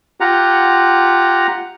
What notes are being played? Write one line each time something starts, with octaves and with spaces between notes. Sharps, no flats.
F4 G4 F#5 A#5